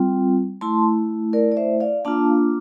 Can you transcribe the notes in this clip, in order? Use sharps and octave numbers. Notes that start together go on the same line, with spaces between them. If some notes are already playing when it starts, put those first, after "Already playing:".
Already playing: G3 C4 F4
A3 E4 A5 C6
A#4 D5
D5
C5 E5
D5 F5
A#3 D4 F4 F5 A5